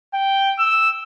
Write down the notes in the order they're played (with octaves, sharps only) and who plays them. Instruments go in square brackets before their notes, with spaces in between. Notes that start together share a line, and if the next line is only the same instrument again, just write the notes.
[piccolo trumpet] G5
E6